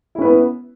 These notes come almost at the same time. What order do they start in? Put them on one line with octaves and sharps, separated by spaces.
E4 C#4 B4 B3